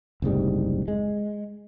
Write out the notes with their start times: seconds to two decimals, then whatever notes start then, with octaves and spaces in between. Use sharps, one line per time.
0.22 F#1 C2 G#2 G3
0.88 G#3